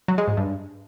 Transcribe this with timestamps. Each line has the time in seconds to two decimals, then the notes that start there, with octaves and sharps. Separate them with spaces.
0.08 F#3
0.18 G#3
0.28 G#2
0.37 G2